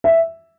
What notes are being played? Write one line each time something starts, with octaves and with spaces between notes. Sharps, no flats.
E5